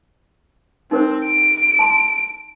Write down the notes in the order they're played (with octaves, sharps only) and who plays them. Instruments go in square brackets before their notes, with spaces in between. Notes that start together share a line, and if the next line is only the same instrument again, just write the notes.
[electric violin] C4 [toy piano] D#4 A#4 C5
[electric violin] D7
[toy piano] A5 C6